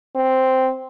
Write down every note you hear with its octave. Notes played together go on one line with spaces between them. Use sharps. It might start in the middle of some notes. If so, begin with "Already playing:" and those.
C4